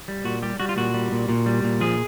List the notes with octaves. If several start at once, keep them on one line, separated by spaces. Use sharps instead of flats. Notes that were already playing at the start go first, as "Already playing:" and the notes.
G3
A#2 F#4
G3 G4
G3 F#4
F4
A#2 F#4
G3
A#2
A#2
G3
A#2
F3 G#4